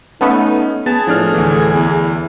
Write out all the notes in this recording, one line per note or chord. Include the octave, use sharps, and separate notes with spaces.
A3 B3 C#4 D#4
B3 G#4 A5
A2 F3 D4 F6
D2 E3
E2